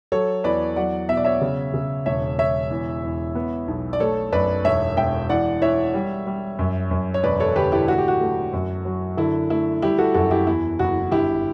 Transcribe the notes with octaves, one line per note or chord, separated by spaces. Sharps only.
F#3 A4 C#5
E2 B4 D5
F#3 D5 F#5
B2 E5
D5
C#5 E5
C#3
C#3
E1 C#5 E5
E1 C#5 E5
E2
E2
B3
B1
D5
A3 A4 C#5
F#2 B4 D5
E1 C#5 E5
E1 E5 G5
E3 D5 F#5
E3 C#5 E5
G3
G3
F#2
F#2
C#5
E1 B4 D5
A4 C#5
D3 G4 B4
E4 G4
A2 F#4
G4
F#4
A3
F#2
F#3
D3 E4
A3 E4
G3 E4 G4
F#4 A4
F#2 F#4 A4
E4 G4
E2 E4
F#1 F#4
G1 E4 G4